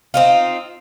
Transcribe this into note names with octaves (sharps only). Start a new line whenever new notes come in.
C4 D#4 F4